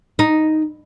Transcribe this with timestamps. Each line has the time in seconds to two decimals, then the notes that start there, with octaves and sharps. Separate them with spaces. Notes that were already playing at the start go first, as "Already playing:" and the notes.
0.19 D#4